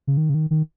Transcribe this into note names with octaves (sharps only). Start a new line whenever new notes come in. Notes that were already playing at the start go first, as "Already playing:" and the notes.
C#3
D#3
C#3
D#3
D#3